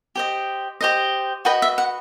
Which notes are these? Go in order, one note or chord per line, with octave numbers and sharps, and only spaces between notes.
G4 C5 D#5
G4 C5 D#5
F#4 B4 D#5 G5
E5
F#5